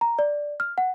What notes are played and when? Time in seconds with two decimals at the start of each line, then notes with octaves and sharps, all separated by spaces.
0.01 A#5
0.19 D5
0.60 F6
0.78 F#5